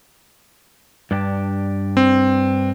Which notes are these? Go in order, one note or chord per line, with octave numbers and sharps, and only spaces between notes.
G2 D4 G4
C4